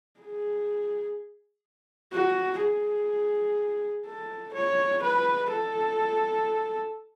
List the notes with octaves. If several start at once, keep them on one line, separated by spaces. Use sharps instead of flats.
G#4
F#4
G#4
A4
C#5
B4
A4